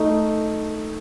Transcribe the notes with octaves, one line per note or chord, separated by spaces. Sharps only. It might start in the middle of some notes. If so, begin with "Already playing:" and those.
Already playing: A3 D#4